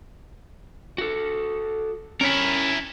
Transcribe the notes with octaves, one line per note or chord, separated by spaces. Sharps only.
F#4 A4
C#4 E4 A#4 C#5